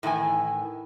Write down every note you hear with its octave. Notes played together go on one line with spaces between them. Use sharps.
A2 D#3 E3 G#5